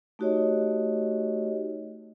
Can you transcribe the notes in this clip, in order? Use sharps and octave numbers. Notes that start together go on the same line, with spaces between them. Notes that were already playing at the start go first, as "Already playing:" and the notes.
A3 D#4 F#4 G4 C#5 D#5